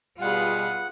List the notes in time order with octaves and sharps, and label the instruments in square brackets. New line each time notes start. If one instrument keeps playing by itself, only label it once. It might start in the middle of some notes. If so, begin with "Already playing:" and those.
[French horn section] B2 G3 [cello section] F4 G#4 B4 [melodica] F#5